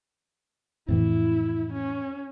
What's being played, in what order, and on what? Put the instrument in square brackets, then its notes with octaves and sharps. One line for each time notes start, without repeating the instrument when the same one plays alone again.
[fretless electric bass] F2 A2 E3 [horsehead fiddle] E4
[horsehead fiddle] C#4